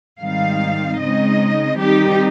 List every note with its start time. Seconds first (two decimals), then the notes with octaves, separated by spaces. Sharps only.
0.20 G#2 D#3 G3 C4 D#4 F5
0.99 C#3 G#3 C4 D#4 D#5
1.78 D#3 G3 C4 D#4 G4